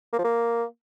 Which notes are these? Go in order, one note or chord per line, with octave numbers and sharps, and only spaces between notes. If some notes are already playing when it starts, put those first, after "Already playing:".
A#3
F3
A#3